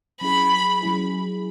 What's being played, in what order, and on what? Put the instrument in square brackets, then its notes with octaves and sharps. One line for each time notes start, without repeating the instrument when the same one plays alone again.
[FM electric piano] F#3 C#4 E4 G#4 [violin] B5
[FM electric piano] F#3 C#4 E4 G#4